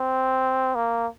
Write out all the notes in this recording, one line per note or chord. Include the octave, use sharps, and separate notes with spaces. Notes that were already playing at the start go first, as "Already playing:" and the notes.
Already playing: C4
A#3